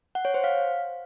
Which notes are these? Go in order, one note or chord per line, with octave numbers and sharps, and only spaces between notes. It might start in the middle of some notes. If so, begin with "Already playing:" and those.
F#5
C#5
C5
F5